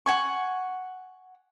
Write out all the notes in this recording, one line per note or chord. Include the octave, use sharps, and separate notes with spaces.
F#5 G#5 C#6